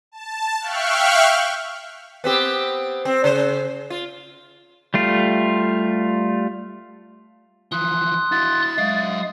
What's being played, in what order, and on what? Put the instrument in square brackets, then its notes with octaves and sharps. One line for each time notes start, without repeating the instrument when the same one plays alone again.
[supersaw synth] A5
E5 F5 G5 C#6 F6 F#6
[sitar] B3 C4 G4
C4
C#3 C5
F4
[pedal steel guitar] G3 A3 F4
[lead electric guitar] E3 F3 [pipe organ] C6 D#6 F#6
[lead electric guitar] E4 F#4 [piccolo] A6
[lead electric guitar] F#3 E5 [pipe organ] G#3 F5 D#6